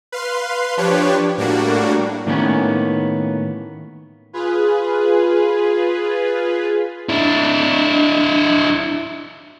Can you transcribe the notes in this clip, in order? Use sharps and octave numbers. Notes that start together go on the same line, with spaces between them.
B4 F5 C6
F3 D4 G4 B4 C#5
A2 G3 A#3 D4 F#4
A2 D#3 A#3 B3 C#4
F4 G#4 B4
D4 E4